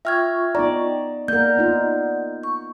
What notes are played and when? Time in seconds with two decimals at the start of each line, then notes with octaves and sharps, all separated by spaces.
0.05 F4 E5 G5 C#6 F6 G#6
0.55 B3 D#4 D5 A#5
1.28 A#3 A#4 D5 F#5 G6
1.57 B3 D#4 F4
2.43 C#6